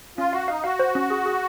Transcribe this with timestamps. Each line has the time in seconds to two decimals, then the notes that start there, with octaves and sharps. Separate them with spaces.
0.18 C#4 F4
0.33 F#4 F5
0.48 D#4 F5
0.64 F#4 F5
0.79 C5
0.95 C#4
1.10 G#4
1.26 G#4